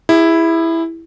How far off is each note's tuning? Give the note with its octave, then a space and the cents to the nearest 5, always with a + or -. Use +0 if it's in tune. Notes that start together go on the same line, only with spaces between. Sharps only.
E4 +0 G#4 -35